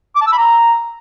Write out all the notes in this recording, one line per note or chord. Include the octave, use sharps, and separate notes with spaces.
D6
A5
E6
B5
A#5